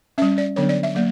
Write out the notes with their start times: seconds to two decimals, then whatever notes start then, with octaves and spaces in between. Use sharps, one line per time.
0.18 G3 C#4 E5
0.38 D5
0.56 D3 F#3 B3 D4 C#5
0.69 D5
0.83 E5
0.95 F#3 A#3 D5